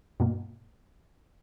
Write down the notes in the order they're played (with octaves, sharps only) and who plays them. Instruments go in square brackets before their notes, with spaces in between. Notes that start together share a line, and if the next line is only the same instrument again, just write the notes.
[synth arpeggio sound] G2 B2 A#3